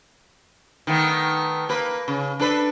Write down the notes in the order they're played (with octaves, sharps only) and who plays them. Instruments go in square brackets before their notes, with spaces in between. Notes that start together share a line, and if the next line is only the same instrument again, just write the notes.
[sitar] D#3 A3 B3
A#3 B4
C#3
D4 A4 B4